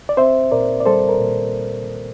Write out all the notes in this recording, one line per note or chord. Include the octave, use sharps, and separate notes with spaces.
D5
C4 C5 E5
A#2 A#4 D5
D5
G3 A4 C5
A#4
A#2